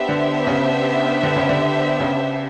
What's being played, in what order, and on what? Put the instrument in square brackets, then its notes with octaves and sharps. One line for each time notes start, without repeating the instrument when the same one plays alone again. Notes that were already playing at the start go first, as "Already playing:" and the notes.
Already playing: [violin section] B3 D4 G4 C5 E5
[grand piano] D3
C#3
D3
C#3
D3
C#3